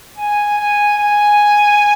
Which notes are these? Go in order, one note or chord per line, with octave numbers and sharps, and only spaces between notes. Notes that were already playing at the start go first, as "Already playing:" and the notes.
G#5
G#5
G#5